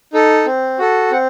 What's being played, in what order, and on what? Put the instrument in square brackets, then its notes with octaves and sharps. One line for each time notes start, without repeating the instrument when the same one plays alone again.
[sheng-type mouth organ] D#4 A4
C4
F#4 A4
C4 F#5